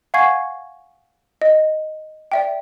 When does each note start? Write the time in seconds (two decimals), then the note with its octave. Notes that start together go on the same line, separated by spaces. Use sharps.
0.14 F5 F#5 G#5 C#6 G#6 C7
1.42 D#5
2.32 D5 E5 G5